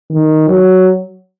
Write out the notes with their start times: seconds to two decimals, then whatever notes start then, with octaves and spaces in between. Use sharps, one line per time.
0.11 D#3
0.48 F#3